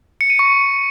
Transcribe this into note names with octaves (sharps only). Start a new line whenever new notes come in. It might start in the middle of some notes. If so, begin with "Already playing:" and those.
C#7
D#7
C#6